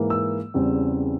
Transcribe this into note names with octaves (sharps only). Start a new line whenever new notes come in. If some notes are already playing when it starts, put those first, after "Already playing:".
Already playing: G#2 E3 A#3
E6
E2 C#3 G3 C4